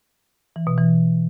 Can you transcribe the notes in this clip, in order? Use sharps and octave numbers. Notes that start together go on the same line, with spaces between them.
E3
B2
E3